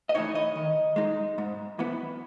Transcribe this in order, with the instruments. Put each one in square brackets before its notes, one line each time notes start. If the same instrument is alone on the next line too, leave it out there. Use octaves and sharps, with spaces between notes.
[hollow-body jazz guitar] D#5
E3 A3 D#4 C#5
D#5
D#3
G#3 D#4
G#2
E3 B3